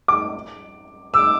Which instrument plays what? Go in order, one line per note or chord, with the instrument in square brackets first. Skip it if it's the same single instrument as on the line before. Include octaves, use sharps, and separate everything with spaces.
[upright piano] D6
[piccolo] D6 [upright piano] E6